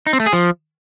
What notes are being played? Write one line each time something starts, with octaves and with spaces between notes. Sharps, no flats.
D#4
C4
A3
G#4
F3